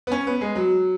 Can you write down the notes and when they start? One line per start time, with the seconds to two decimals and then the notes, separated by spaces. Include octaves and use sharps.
0.07 B3
0.12 C#4
0.27 B3
0.41 G#3
0.55 F#3